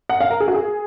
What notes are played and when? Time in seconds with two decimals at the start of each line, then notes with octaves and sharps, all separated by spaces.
0.09 F#5
0.20 F5
0.30 A#4
0.40 G#4
0.48 F#4
0.54 G#4